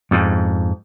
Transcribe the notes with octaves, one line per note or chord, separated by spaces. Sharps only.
F2 G#2